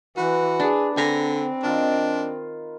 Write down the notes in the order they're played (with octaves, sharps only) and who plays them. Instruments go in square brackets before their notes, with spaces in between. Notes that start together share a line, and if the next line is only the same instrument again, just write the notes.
[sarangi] E3 [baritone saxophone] F#4 [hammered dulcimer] B4
[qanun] D4 [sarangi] G#4
[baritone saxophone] D3 [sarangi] C4 [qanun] G#5 A#5
[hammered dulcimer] D#3 F4 [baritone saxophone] D4